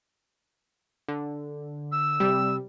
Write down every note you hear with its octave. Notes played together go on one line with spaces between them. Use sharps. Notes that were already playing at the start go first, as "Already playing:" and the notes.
D3
E6
C3 G3